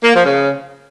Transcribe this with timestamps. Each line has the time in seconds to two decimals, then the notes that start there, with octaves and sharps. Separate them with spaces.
0.04 A#3
0.14 F3
0.25 C#3